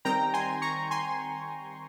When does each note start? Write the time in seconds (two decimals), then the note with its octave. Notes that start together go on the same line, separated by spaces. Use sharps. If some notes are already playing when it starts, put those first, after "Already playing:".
0.05 D#3 G3 C4 G5 A#5
0.34 G#5 C6
0.62 A#5 C#6
0.91 G#5 C6